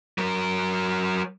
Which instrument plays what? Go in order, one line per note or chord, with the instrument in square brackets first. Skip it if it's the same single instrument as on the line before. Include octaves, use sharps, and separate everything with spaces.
[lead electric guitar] F#3 A#4